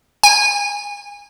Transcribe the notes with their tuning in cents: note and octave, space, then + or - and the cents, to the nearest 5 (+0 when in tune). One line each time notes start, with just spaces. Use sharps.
G#5 -25